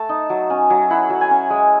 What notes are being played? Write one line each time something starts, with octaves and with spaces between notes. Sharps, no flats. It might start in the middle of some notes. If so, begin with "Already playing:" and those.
Already playing: A3 A5
D#4
F#3
C#4
F#3
E4 F#5
F#3
G#5
C#4
G#3